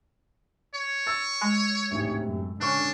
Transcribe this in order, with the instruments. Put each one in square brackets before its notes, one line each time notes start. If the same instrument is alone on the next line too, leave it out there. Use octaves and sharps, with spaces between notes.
[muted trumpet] C#5
[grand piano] E6 A6
[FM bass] G#3
[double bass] A1 G#2 [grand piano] D2 C3
[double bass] F#2
[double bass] D3 C#4 [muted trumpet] D4 [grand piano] C#6 F6 F#6